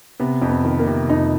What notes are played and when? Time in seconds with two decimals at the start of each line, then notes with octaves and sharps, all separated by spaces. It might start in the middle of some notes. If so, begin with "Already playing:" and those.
0.20 C3 B3
0.42 F2
0.49 B3
0.65 D#3
0.79 A#3
0.87 C3
1.09 F2 D#4